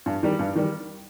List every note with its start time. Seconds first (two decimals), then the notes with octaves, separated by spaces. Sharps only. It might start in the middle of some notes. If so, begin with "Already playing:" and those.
0.06 G2
0.23 D#3 G3
0.39 G2
0.55 D#3 G3